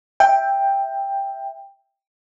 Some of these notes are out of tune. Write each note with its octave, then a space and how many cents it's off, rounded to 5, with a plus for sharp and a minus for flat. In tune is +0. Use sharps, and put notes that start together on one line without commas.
E5 +0 G5 +10